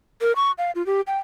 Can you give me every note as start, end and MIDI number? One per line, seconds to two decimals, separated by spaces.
0.21 0.32 70
0.36 0.52 85
0.58 0.71 77
0.75 0.85 65
0.86 1.01 67
1.07 1.18 79